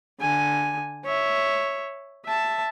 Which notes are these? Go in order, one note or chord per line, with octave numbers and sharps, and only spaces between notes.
D3 G#5
C#5 E5
E5 A5